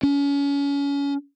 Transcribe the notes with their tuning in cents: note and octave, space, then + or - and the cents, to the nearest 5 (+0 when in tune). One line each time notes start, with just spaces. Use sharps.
C#4 +30